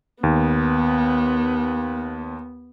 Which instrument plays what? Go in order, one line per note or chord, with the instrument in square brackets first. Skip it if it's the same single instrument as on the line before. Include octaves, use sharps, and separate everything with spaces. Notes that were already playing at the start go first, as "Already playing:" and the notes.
[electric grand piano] D#2 [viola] B3